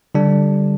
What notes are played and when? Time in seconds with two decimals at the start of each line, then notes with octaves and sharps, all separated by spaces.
0.15 D3 G3 D4